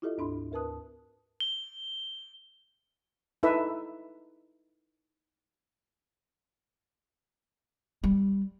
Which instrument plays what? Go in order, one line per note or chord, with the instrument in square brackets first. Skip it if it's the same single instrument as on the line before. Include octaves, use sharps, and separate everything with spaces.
[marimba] E4 F4 G4 A4 D#5 E5
D2 G#2 D4 B5 C6
D2 A#4 B4 A5 D#6 F#6
[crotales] G7
[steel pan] D#4 E4 A4 B4 E5
[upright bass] G3